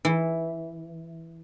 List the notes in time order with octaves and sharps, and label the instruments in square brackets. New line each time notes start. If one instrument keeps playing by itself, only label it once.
[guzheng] E3